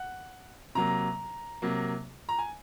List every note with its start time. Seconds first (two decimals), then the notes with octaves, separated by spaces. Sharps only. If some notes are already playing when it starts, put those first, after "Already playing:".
Already playing: F#5
0.75 C3 F#3 A#3 A#5
1.62 C3 F#3 A#3
2.29 A#5
2.39 G#5